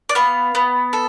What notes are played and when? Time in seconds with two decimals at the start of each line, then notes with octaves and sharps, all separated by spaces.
0.09 D5
0.15 B3 F5
0.55 B3
0.93 A4